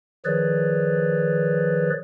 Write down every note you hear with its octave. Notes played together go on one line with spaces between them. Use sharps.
D#3 F3 G#4 B4 C#5 D5